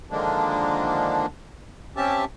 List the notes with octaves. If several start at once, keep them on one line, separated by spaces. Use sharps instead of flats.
D3 D#3 F3 G#3 A#3 D4
C4 C#4 G4 E5 A5